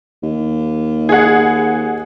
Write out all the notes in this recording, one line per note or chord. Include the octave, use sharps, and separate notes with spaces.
D#2
G#4 F#5